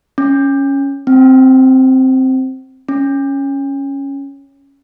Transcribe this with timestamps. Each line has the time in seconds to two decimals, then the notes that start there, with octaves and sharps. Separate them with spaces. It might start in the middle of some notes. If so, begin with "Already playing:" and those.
0.18 C#4
1.07 C4
2.88 C#4